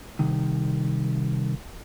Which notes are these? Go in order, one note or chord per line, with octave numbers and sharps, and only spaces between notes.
C2 D#3